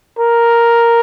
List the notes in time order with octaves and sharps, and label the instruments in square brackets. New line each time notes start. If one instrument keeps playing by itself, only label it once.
[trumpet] A#4